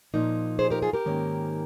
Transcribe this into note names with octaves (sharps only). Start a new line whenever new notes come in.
A#2 F3 A#3 D#4
G#4 C5
G4 A#4
F4 G#4
G4 A#4
G#2 D#3 A#3 C#4